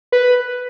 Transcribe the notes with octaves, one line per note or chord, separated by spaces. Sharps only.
B4